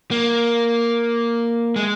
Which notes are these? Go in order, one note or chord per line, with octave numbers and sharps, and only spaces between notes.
A#3
G#3